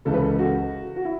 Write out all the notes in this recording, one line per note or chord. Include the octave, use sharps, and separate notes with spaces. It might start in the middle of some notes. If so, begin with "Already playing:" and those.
C#2 C#3 E3 A4
B4
A4
F#4
F#4
E4